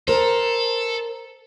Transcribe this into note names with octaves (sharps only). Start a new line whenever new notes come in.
A4 A#4 C5